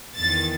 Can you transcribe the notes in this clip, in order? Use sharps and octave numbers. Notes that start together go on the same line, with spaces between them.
E2 D#3 A6